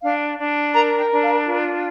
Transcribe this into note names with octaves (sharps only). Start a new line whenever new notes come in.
D4 F5
D4
A#4 A#5
G5
D4
F5
F4